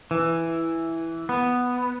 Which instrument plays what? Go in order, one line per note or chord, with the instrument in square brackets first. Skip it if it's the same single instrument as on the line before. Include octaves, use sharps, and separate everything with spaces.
[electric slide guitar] E3
B3